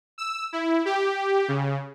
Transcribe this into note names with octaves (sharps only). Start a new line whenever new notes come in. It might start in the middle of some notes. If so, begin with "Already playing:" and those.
E6
E4
G4
C#3